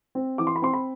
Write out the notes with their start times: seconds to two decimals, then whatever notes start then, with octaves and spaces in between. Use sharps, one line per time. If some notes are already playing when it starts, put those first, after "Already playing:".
0.15 C4
0.38 E3 D6
0.47 C6
0.56 B5
0.62 C4 C6
0.73 B5